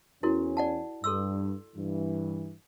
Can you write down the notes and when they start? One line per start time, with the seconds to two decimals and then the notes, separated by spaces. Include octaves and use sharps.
0.23 E2 C#4 E4 F#4 A#4
0.57 D5 F#5 A5
1.04 G2 A4 C6 E6
1.76 G2 E3